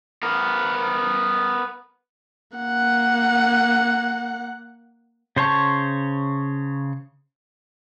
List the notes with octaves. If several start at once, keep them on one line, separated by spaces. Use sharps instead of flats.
B3 A#4
A#3 F#5
C#3 C5 C#5 A5 C#6